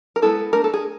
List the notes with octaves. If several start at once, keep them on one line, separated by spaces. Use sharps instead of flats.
A#4
G#3 B3 E4 A4
A3 D4 A#4
A4
G#4